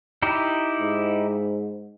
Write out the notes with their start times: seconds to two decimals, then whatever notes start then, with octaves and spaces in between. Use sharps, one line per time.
0.22 D#4 E4 G4
0.80 G#2